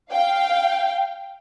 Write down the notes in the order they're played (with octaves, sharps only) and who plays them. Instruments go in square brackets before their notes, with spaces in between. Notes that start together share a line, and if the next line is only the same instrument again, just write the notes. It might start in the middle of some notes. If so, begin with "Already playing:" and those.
[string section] F5 G5